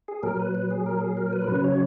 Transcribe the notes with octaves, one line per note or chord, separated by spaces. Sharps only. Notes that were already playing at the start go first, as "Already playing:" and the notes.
G#4
A#2 F#3 A#4
B4
B4
G#4
A#4
G#4
A#4
B4
A#4
C#3 F#3 B4
C#5